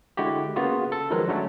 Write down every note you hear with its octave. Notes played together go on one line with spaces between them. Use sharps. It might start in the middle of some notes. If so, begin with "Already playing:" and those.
D3 G#3 E4 F#4 G4
C#3 A#3 B3 F4 F#4 G#4
A4
D#3 F3 F#3 G#3 A#4 B4
D3 F#3 A3 C#4 D4